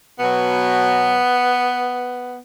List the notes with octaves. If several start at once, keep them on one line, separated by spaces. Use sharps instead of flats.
B2 F#3 B3